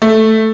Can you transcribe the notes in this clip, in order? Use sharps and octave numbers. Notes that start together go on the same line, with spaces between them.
A3